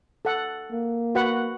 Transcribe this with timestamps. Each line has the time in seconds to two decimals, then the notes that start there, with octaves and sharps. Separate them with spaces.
0.25 A4 F#5
0.72 A#3
1.15 F#4 B4 F#5